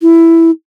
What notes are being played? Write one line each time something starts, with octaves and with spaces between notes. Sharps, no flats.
E4